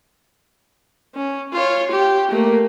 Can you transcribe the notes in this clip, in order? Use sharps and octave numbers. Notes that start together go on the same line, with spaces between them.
C#4
F4 C#5
G4
A3 A#3